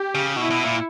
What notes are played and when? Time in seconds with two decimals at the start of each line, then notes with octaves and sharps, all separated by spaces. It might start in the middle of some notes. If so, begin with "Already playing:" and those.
Already playing: G4
0.15 C#3
0.36 B2 E4
0.50 B2
0.65 A#2